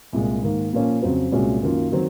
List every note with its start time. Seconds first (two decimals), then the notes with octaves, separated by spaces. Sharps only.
0.13 C2 A#2 G#3
0.43 G#2 D#3 A#3
0.73 A#2 F3 A#3 C#4
1.02 F2 C#3 F#3 C4
1.32 C2 A#2 G#3 C#4 F#4
1.62 F#2 D#3 F#3 A#3 F4
1.92 D#3 F#3 C4